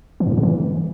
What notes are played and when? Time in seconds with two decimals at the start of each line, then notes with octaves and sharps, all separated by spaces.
0.20 E3
0.26 F#2
0.32 A2
0.38 C#3
0.43 E3